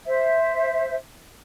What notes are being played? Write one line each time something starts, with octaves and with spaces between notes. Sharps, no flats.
C5 E5